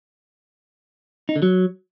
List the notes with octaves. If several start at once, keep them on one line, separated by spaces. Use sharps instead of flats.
D#4
D3
F#3